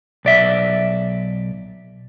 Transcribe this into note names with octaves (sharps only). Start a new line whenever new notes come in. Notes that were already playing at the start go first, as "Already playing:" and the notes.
B1 D5 E5